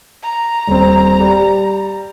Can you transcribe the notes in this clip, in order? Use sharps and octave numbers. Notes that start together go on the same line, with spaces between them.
A#5
D#1 C4
G3